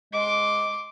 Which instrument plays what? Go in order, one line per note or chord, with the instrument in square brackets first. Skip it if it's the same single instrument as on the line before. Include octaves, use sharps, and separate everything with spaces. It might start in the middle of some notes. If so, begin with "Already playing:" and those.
[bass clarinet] G#3 [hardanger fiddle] C6 D6